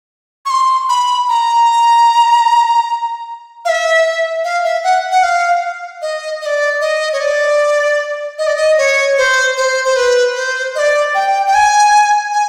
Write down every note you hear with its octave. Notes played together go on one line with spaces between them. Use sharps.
C#6
C6
B5
A#5
F5
E5
F5
E5
F#5
F#5
F5
D#5
D#5
D5
D#5
C#5
D5
D#5
D5
D#5
C#5
C5
C5
C5
B4
C5
D#5
D5
G5
G5
G#5
G#5